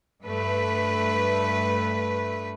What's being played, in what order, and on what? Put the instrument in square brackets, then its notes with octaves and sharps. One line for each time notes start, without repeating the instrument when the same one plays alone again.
[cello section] G2 A3 B4